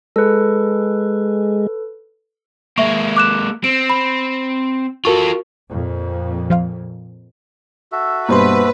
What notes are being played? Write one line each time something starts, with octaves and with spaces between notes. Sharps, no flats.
G#3 A4 B4
G#3 A#3 E5 C#6
D6 F#6 E7
C4 D7
B5
F4 F#4 A4 A#4 C#6
F2 A#2
F3 F4 F5
F#4 A4 E5
G2 B2 A#3 B4 C5 C6